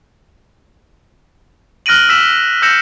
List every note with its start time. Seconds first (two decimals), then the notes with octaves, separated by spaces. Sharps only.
1.86 F6 F#6 A#6 D7 D#7 F#7
2.09 E6 B6 E7
2.62 E6 G6 A#6 C#7 E7